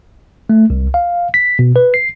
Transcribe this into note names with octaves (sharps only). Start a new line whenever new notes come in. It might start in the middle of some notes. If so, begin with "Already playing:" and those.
A3
C2
F5
B6
B2
B4
C7